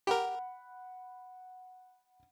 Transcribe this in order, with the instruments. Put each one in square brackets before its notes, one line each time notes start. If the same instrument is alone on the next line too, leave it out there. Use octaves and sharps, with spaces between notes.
[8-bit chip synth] G4 A#4 [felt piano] F#5 B5